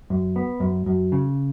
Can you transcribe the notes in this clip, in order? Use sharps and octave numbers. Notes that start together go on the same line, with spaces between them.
F#2
B3
F#2
F#2
C#3